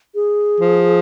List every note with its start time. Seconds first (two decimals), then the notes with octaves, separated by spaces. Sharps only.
0.15 G#4
0.60 F3